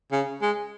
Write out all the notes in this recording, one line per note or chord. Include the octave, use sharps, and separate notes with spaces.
C#3
G#3